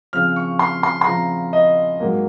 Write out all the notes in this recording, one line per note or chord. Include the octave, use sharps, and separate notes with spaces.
C#3 F3 C4 F6
C#6
C6
C6
C6
C#3 F3 C4 A#5
D#5
G#2 F#3 A#3